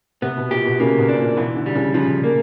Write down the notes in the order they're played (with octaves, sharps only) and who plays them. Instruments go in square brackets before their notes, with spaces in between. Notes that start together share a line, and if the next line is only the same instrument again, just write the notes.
[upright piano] C3 [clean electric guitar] B3
[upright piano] B2
[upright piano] A#2 [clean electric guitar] G4
[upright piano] B2
[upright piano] C#3 [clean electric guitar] A#3
[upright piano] B2
[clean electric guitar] D4
[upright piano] A#2
[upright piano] B2 [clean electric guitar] E3
[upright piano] D3
[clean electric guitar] G3
[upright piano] C#3
[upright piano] C#3 [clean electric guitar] F3
[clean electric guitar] A#3